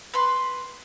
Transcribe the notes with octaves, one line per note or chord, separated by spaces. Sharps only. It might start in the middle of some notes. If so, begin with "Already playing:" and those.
B4 C6